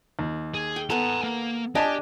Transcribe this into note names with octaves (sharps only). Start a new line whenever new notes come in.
D#2
G#4
G5
B3 A4 G#5 A#5
A#3
D4 G4 D#5 G#5 A5